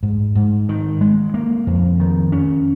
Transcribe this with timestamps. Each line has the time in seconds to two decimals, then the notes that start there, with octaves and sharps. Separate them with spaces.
0.03 G#2
0.35 G#2
0.69 D#3
1.01 G#3
1.34 A#3
1.67 F2
2.00 D#3
2.32 C#4